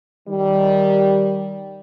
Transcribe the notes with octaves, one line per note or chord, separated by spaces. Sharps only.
D#3 G3